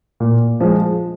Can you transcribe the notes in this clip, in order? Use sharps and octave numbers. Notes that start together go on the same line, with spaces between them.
A#2
F3 G#3